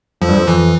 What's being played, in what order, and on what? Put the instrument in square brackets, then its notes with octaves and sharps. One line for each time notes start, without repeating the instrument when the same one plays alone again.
[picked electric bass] F2 [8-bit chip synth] F3
[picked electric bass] G2
F2
[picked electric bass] F2 [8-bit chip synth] E3